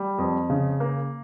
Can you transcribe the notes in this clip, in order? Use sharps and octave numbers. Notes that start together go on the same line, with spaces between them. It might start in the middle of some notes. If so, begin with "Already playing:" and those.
Already playing: G3
F2
C#3
A#3